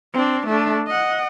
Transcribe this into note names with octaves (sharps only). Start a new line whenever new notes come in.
C4 D4
A3 D4
D#5 F#5